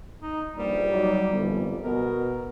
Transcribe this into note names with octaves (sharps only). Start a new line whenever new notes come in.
D#4
A#1 G2 G3
F#3 D#4 D5
G1 C2 F2
B2 B3 A#4